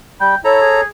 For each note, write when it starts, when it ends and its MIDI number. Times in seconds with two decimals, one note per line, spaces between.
0.21 0.35 55
0.21 0.37 79
0.21 0.35 83
0.44 0.58 64
0.44 0.81 69
0.44 0.81 73
0.44 0.81 82
0.61 0.86 68